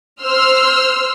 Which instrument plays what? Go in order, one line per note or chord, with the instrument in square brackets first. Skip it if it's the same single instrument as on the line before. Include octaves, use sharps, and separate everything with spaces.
[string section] C5 C6 E6 F6